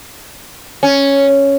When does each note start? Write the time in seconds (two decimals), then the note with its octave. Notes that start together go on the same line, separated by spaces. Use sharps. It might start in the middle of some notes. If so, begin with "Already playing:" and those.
0.83 C#4